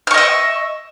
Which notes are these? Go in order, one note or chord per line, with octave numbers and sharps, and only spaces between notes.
D#5 E5 C#6 F6